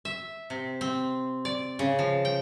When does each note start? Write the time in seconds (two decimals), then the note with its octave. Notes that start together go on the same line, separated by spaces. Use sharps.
0.05 E5
0.50 C3
0.81 C4
1.45 D5
1.79 C#3
1.99 F3
2.25 G5